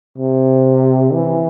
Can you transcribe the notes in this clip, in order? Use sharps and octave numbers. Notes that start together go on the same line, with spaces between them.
C3
E3